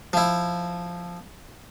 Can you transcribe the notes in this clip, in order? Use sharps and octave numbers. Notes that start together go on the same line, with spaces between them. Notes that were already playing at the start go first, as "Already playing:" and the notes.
F3 E4